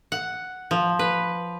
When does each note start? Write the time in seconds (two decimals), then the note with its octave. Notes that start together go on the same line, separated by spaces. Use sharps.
0.12 F#5
0.71 F3
0.99 B4